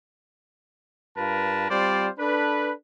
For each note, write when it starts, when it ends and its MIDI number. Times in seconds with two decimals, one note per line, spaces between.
1.17 1.68 43
1.17 1.68 65
1.17 1.68 70
1.17 1.68 71
1.17 1.68 81
1.70 2.09 55
1.70 2.09 60
1.70 2.09 65
1.70 2.09 72
1.70 2.09 74
2.19 2.72 62
2.19 2.72 69
2.19 2.72 71